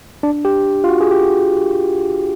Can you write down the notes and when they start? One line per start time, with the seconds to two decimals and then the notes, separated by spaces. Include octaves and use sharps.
0.23 D4
0.45 G4
0.84 F4
0.89 F#4
1.01 G#4
1.11 G4